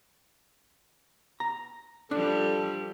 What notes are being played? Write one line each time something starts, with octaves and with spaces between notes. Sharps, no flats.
A#5
F3 G3 D4 A4